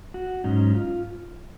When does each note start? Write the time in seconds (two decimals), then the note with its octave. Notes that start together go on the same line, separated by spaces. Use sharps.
0.14 F#4
0.44 G#2 F#3 C#4 D#4
0.75 F4